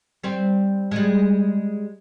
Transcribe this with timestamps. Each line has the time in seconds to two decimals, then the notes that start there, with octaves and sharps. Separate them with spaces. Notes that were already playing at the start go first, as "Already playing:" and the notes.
0.23 G3 C4
0.91 G3 G#3